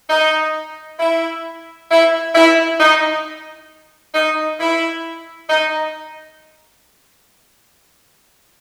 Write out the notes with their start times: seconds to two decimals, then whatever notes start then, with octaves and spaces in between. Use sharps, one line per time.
0.10 D#4
0.99 E4
1.90 E4
2.35 E4
2.80 D#4
4.15 D#4
4.60 E4
5.49 D#4